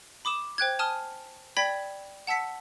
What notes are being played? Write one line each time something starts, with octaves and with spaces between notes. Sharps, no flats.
B5 D6 D#6 E7
C5 G5 F#6 G#6
G#5 A5 D#6 F6 D#7 G7
D5 G5 B5 G#6 B6 F#7
F#5 A5 E6 B6 C#7